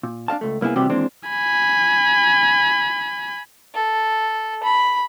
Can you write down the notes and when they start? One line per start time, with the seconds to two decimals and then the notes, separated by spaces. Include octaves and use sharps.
0.03 A#2
0.28 D4 D#5 F5 A5
0.41 C#2 A3
0.61 C2 A#3 B3 E4 G#4
0.76 D#2 C3 E3 G3 F#4 G4
0.90 D#2 E3 G#3 C4 D4
1.29 G#5 B5
3.75 A4
4.64 B5